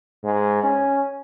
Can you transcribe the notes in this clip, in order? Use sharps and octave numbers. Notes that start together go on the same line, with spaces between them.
G#2
C#4